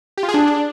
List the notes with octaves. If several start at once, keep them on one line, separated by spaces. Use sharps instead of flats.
G4
F4
G#4
D4